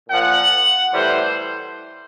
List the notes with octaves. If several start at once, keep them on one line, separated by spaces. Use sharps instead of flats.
A#2 F3 F#5
A2 E3 G3 C5